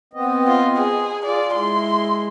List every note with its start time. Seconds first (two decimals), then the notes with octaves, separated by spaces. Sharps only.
0.13 B3 C4 D#5
0.48 F4
0.77 G#4
1.26 F4 G#4 D5
1.55 G#3 E4 C6